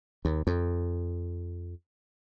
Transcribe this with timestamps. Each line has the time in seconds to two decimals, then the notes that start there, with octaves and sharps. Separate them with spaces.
0.25 D#2
0.47 F2